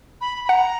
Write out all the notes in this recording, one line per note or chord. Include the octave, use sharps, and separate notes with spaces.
B5
B5
F#5 A#5